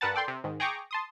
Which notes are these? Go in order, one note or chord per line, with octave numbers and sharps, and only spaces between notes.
G2 A#4 B4 F#5 A5 A6
A4 D5 G5 C6
C3
G#2 D#3
G#4 G5 A#5 C#6 D6
A5 C6 D#6